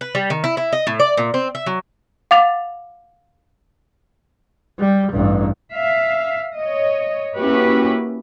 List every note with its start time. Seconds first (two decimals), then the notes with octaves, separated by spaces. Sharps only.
0.01 B4
0.15 G3
0.30 D#3
0.44 E4
0.57 E4
0.72 D#5
0.87 A2
1.00 D5
1.17 A#2
1.34 C4
1.55 E5
1.66 F#3
2.31 F5 F#5 D6 A6 F7
4.79 G3
5.13 A1 G2
5.73 E5 F5
6.56 C#5 D#5
7.36 A#3 C#4 E4 F#4 G4 B4